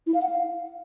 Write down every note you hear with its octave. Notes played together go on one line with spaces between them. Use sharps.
E4
F5
F#5
F5